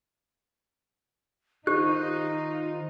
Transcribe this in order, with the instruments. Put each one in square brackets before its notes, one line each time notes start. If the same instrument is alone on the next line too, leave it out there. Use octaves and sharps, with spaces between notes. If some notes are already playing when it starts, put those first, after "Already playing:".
[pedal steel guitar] D#3 C5 F#6 [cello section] D#4 [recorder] F4 [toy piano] G4